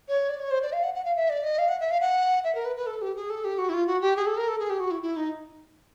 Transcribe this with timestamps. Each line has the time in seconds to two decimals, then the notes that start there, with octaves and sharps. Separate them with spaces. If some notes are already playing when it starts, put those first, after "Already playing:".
0.09 C#5
0.29 D5
0.40 C#5
0.51 C5
0.62 D5
0.73 F5
0.83 F#5
0.94 F#5
1.05 F5
1.16 E5
1.30 D5
1.44 D#5
1.59 F5
1.69 F#5
1.80 E5
1.91 F5
2.01 F#5
2.44 E5
2.55 A#4
2.65 B4
2.76 B4
2.87 A4
3.02 G4
3.16 G#4
3.30 A4
3.45 G4
3.58 F#4
3.69 E4
3.74 F4
3.87 F#4
4.01 G4
4.16 G#4
4.26 A4
4.37 A#4
4.48 A4
4.60 G#4
4.70 G4
4.80 F#4
4.91 E4
5.03 E4
5.17 D#4